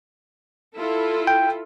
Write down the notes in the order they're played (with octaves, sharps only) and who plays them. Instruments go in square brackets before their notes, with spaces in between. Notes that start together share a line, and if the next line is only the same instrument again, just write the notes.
[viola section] E4 F4 A4
[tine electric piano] G5